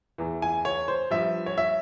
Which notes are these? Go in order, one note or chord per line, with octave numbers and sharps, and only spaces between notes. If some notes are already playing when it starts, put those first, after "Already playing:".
E2 E3
G#5
C#5
C5
G2 F3 E5
C#5
E5